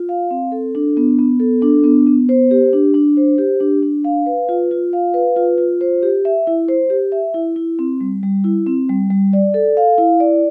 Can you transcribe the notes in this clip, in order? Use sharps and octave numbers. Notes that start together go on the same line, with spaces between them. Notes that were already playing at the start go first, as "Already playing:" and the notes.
Already playing: F4
F5
C4
A4
D4
B3
B3
A4
D4
B3
B3
C5
G4
D4
D4
C5
G4
D4
D4
F5
B4
F4
F4
F5
B4
F4
F4
C5
G4
E5
E4
C5
G4
E5
E4
E4
C4
G3
G3
E4
C4
G3
G3
D5
A4
F5
E4
D5